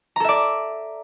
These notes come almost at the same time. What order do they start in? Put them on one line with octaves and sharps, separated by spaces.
A#5 A4 E5 D5